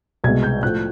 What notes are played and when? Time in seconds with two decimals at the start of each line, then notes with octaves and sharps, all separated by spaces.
0.24 C2 B2 G#3 G#6
0.43 G6
0.62 A2 F3 A3 F#6